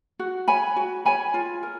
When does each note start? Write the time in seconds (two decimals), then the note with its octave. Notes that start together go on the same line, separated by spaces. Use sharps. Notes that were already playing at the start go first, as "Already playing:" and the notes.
0.19 F#4
0.48 C#5 G#5 B5
0.76 F#4
1.05 C#5 G#5 B5
1.34 F4
1.63 A#4